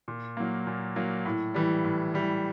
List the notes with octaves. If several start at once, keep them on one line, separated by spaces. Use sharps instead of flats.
A#2
F#3 A#3
A#2
F#3 A#3
A2
E3 G3
A2
E3 G3